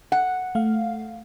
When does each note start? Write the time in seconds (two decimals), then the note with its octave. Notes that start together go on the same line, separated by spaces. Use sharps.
0.12 F#5
0.55 A3 F5